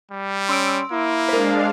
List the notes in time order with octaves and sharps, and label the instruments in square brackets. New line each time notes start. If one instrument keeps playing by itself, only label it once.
[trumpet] G3
[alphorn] C#4 [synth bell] C6 E6 D7
[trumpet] A#3 [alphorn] E4
[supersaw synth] G#3 D4 F5 [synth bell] A#4 C5